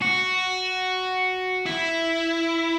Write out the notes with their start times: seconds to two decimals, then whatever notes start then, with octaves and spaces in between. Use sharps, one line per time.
0.02 F#4
1.66 E4